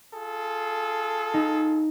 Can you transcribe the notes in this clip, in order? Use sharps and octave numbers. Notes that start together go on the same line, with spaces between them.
F4 G#4 A4
D#4